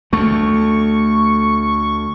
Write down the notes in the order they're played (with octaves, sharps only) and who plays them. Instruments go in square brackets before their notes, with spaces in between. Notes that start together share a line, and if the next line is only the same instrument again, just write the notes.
[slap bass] D2 A3 [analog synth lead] C#6